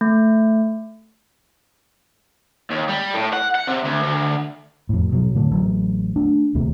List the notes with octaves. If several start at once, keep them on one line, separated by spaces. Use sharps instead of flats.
A3
D#2
G3
A2
F#5
F#5
C3
D2
D2
F2 A2
B2 F#3
A2 D3 A3
A1 F#3
A3 D4
D1 D#2 C3 A3